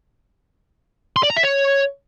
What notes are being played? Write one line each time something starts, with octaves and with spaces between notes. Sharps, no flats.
C6
D5
A#5
E5
C#5